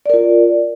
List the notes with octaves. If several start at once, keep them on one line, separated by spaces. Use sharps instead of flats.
F4 A#4 D5